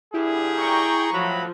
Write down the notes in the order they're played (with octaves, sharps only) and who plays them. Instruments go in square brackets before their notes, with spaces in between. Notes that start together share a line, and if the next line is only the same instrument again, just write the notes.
[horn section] G2 D3 G4 [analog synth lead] E4 [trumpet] G#4
[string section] G5 A#5 C#6
[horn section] A2 F#3 [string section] F3 [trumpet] B5